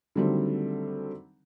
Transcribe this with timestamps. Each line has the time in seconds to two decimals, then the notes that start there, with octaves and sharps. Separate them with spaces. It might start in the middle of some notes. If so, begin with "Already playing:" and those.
0.16 D3 D#3 F#3 G3 A3 C4